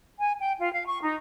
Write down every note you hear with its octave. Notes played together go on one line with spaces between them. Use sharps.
G#5
G5
F4
F5
C#6
D#4